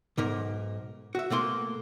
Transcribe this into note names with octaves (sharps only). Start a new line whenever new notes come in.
B1 G#2 A#4
F#4 E5
B2 A3 A#3 C6